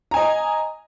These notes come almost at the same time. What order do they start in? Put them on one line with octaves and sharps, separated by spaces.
A#5 G#5 D#5